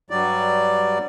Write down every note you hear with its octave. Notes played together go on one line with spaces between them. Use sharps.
G2 F#3 G3 D5